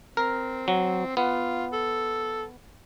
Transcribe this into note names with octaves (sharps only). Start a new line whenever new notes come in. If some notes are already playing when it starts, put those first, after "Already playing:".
C4 A#4
F#3
B3 F4
A4